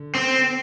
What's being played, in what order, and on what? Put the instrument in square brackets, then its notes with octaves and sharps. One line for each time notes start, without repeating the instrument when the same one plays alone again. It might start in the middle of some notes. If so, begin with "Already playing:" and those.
Already playing: [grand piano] D3
[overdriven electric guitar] C4